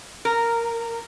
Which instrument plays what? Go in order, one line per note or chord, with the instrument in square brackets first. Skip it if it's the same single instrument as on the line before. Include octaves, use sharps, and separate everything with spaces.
[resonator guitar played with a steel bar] A#4